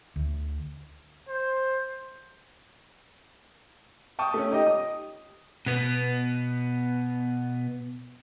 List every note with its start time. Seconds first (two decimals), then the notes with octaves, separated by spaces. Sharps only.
0.16 D2
1.29 C5
4.19 G5 A5 C#6 D#6
4.34 A3 C#4
4.51 D#4 G4 D#5 G5
4.66 D#6
5.66 B2 B3